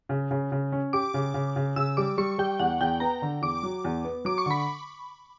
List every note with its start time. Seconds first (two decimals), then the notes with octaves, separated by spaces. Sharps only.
0.09 C#3
0.31 C#3
0.52 C#3
0.72 C#4
0.93 G4 D6
1.14 C#3
1.34 C#3
1.56 C#3
1.76 C#3 E6
1.97 G3 D6
2.18 G3 C#6
2.38 G3 G5
2.60 E2 F#5
2.81 E2 G5
3.00 B3 A#5
3.22 D3
3.42 E2 D6
3.63 F#3
3.84 E2
4.05 B3
4.25 F#3 D6
4.38 C#6
4.46 D3 B5